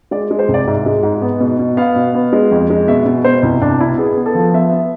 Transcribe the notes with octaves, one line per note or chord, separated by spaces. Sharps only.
G#3 D5
G#3
C5
C2
D5
G#2 E5
G#3
G#2
B3
B2
B2
B3 F5
B2
B3
G#3
F2
G#3
B2 E5
B2
B2 C5
C2 E4
C2 D4
B2 E4
B3 G#4
B3
A4
F3
B3 E5
B3